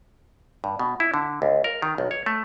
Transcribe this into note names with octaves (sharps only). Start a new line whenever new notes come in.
G2
B2
E4
D3
C#2
A#4
D#3
B1
C#5
A3